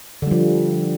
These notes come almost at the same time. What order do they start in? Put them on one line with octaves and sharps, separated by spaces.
D3 G3 F3